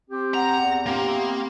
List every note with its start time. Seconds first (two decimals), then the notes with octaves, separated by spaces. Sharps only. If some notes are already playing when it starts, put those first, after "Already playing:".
0.10 C4 G4
0.34 F#5 A#5
0.60 E2
0.86 G2 A#2 A#3 C4 G4
1.07 A3 B3 C4